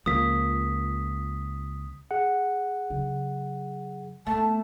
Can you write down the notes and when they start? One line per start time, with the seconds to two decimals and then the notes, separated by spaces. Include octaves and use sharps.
0.06 C#2 F3 A#3 D#6 B6
2.11 G#4 F#5
2.90 C#3 F#3
4.27 A3 B3 A5